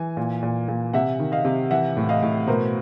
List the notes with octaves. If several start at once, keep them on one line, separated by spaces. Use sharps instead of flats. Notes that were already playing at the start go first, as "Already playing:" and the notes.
Already playing: E3 G#5
A#2
A#2
A#2
C3 E5 F#5
D#3
D#5 F5
C3
E3 E5 F#5
A2
D#5 F5
A2
B2 A#4 C5